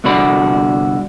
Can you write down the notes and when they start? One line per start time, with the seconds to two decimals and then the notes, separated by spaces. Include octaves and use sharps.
0.04 C2 G2 D3 F#4 D5 B5